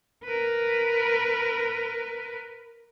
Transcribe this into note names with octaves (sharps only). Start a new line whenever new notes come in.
A#4 B4